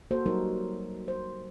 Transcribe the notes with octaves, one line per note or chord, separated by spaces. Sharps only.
A#3 F#4 A4 C5
F#3 G3 D#4 A#4
C5